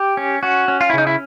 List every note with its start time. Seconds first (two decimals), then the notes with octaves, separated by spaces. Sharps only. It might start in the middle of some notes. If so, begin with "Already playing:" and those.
Already playing: G4
0.17 C#4
0.43 C#4 F#4
0.68 C#4
0.81 F4
0.90 E4
0.93 C#3 D#4
1.07 E4